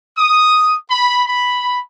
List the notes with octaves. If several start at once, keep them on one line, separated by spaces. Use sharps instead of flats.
D#6
B5
B5